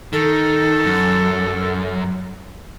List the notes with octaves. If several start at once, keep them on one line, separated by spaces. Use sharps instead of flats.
D#3 A4
F#2